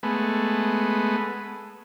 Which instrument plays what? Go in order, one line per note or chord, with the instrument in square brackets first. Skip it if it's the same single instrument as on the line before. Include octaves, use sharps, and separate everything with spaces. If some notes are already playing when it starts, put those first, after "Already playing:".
[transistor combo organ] G#3 A3 B3